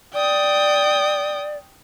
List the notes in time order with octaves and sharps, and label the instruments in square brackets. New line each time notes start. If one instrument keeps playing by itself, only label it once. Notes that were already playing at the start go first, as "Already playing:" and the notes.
[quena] D5 [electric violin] G5 D#6